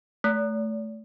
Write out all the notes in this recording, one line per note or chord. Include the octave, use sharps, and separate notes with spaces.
A3